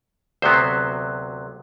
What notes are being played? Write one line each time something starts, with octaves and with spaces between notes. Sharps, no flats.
D2 C3 F#3 B3 C5